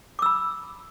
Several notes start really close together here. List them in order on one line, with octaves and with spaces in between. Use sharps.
D6 E6 B5